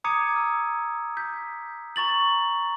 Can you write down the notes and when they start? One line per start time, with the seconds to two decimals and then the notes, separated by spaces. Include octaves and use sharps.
0.04 A#5 D6 D#6 G#6 C#7 D#7
0.36 E6
1.17 G6 B6
1.96 A#5 C#6 A6 F#7